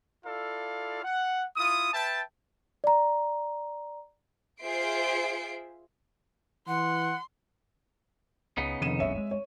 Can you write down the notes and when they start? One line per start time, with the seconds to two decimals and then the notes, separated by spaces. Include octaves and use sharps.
0.24 E4 F4 A4 D5 F5
1.04 F#5
1.57 E4 F4 D#6
1.93 B4 E5 G5 A5
2.84 D5 A#5
4.61 F4 G#4 C5 E5 C7 D7
6.68 E3 F#5 C6
8.57 C#2 C#3 B3 D#4
8.81 F1 D#3 D#7 E7
9.00 F#1 C#2 G2 C#5 E5
9.18 G#3
9.31 C#5